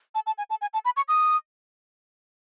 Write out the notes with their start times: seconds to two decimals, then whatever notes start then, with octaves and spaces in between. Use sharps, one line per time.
0.15 A5
0.27 A5
0.38 G#5
0.50 A5
0.62 G#5
0.74 A5
0.85 B5
0.97 C#6
1.08 D#6